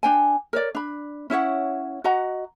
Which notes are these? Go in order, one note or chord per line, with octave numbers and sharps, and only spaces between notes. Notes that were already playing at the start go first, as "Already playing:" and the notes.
D4 G5 G#5
A#4 C#5 D5
D4 B5
C#4 E4 C#5 F#5
F#4 D#5 F#5 A#5